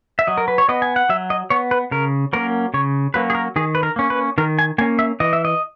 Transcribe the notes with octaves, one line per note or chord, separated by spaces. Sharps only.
E5
F#3 D#5
A#4
B4
C#5
B3 D#5
G#5
F#5
F#3 E5
D#5
B3 C#5
B4
C#3 A#4
F#3 A#3 C#4 A#4
C#3 C#5
F#3 A#3 C#4 B4
G#4
A#4
D#3 G#4
B4
A#4
A#3 C#4
B4
D#3 A#4
G#5
A#3 C#4 G#5
E5
E3 D#5
E5
D#5